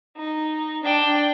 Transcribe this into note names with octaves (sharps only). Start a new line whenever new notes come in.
D#4
D4 G5